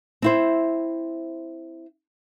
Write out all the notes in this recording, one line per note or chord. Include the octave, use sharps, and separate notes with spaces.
C4 E4 C5